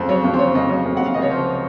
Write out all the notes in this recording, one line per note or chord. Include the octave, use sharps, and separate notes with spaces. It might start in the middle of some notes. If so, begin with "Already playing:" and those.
Already playing: F2 C#3 C5
F#3 C#5
F2
C5
C#3 C#5
F2 D#5
F#3 C#5
F2
C3 F#5
F5
C#2 D#5
C#5
F3 C5